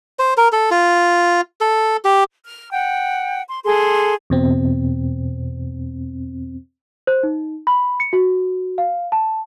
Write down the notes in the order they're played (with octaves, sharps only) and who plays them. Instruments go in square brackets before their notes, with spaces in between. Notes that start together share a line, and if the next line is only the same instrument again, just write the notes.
[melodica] C5
A#4
A4
F4
A4
G4
[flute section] F6
F#5 G5
C6
G#4 A4 C6
[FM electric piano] E2 B2 C4
[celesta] C5
D#4
B5
C#7
F#4
F5
A5